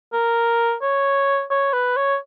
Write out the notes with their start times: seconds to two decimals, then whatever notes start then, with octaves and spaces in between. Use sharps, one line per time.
0.13 A#4
0.82 C#5
1.50 C#5
1.73 B4
1.96 C#5